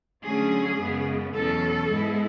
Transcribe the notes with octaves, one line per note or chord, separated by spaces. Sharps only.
D3 F#3 A3 C#4 G#4
F#2 C#3 G#3 B3
E2 B2 F#3 C#4 A4
G#2 G#3 B3 E4